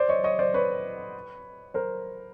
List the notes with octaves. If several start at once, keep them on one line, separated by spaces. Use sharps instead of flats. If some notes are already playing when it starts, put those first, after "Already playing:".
Already playing: C5 D5
C#5 D#5
C#5 D#5
C5 D5
B4 C#5
A#4 C5